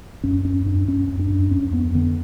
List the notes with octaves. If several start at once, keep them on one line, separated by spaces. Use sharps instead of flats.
F#2 C#4
F#2 C#4
F#2 D4
F#2 C#4
F#2
D4
F#2
F2 C#4
F2 B3
D3 B3